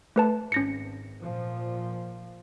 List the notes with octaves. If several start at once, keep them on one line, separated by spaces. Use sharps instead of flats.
A3 B4 A5
G#1 C#4 A#6 C#7
A#2 F3